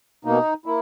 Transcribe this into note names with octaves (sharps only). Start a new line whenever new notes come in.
B2 A#3 D#4
A#3 E4